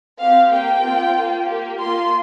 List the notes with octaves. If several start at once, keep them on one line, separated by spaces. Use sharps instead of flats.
C4 G4 F5
A#3 G4 G5
C4 F4
A#3 F4
A#3 G4
A#3 F4 C6